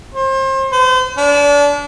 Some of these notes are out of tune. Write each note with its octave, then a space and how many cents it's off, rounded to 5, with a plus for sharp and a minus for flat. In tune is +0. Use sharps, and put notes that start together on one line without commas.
C5 +35
C5 -40
D4 -30